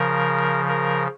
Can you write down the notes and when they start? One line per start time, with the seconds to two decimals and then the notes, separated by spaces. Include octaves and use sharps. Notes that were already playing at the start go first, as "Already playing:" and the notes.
Already playing: C#3 F3 A#4
0.68 A#4